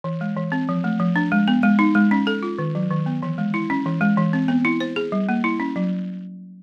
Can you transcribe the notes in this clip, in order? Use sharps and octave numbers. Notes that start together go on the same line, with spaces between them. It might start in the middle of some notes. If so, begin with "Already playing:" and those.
E3
G#3
E3
C4
F3
A3
F3
D4
G#3
B3
G#3
D#4
G#3
C#4
A4
F4
D#3
F#3
D#3
B3
E3
G#3
E4
C#4
E3
G#3
E3
C4
B3
E4
C5
G#4
G3
A#3
E4
C#4
F#3